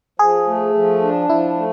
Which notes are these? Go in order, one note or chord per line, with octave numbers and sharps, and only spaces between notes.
F3 G#4
A3
F3
D4
F3 E4
A3